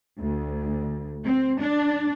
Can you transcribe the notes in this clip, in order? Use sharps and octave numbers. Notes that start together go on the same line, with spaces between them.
D2
C4
D4